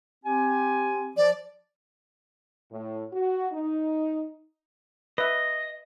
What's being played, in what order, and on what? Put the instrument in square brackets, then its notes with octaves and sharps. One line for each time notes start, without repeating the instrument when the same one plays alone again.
[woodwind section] C4 G4 G#5
[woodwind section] F3 [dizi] D5
[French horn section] A2
F#4
D#4
[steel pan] B4 E5 [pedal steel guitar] D#5